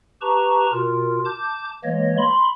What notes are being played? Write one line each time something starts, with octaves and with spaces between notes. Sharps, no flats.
G4 B4 A5 A#5 C#6
B2 F4 A#4
A5 D6 G6
E3 G#3 A#3 C#5 D#5
B5 C6